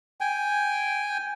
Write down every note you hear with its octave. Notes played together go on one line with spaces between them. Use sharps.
G5 G#5